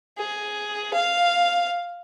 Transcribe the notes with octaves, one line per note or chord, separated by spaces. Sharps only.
G#4
F5